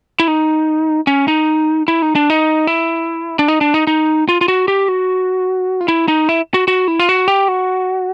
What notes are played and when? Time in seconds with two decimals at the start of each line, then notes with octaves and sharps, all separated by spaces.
0.20 E4
0.28 D#4
1.07 C#4
1.28 D#4
1.88 E4
2.02 D#4
2.15 D4
2.30 D#4
2.67 E4
3.39 D4
3.48 D#4
3.61 D4
3.74 D#4
3.87 D#4
4.29 F4
4.41 F4
4.48 F#4
4.68 G4
4.88 F#4
5.81 F4
5.88 E4
6.08 D#4
6.29 E4
6.54 F#4
6.68 F#4
6.88 E4
6.99 F4
7.09 F#4
7.28 G4
7.48 F#4